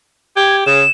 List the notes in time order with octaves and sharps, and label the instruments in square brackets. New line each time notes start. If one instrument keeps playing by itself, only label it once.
[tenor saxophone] G4 [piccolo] G#6
[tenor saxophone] C#3 [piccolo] E7